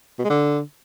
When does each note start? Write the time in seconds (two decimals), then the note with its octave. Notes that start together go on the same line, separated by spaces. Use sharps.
0.19 B2
0.24 G#3
0.30 D3